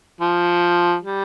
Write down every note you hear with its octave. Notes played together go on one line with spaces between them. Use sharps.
F3
G3